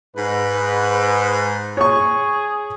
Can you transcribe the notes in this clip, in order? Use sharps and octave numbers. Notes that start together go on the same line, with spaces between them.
G#2 B4
G#4 C#5 C#6